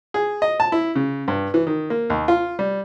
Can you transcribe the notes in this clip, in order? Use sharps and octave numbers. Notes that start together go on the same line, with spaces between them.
G#4
D#5
A5
E4
C#3
G2
E3
D#3
A#3
D#2
F4
G3